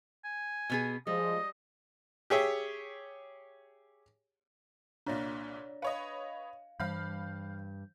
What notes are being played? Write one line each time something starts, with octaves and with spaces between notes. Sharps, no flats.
G#5
B2 B3 G#4
F3 G3 G#3 D#5
G4 G#4 C#5 E5
C2 A#2 D4 C#5 D5
B4 C#5 D#5 F5
G2 E3 F5 B5 G6